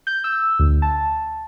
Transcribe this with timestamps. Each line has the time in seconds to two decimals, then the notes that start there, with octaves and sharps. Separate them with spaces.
0.07 G6
0.24 E6
0.59 D2
0.82 A5